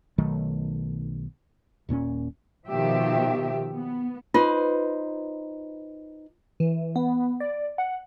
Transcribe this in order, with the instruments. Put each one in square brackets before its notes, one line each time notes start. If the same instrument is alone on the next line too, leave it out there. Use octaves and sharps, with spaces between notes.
[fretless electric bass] B1 D#3 F#3 A3
D#1 A#2 A#3 C#4
[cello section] B2 D#3 F3 G4 E5
B3
[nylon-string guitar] D#4 B4 C5 [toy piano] F4
[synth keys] E3
B3
D5
F#5